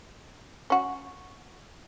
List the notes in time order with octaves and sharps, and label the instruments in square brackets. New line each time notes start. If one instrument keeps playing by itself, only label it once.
[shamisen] C#4 F#4